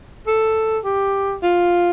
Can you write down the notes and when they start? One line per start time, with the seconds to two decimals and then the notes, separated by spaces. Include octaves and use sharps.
0.27 A4
0.84 G4
1.43 F4